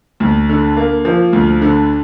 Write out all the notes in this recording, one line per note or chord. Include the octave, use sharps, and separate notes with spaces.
D2
D3
A#3
F3
D2
D3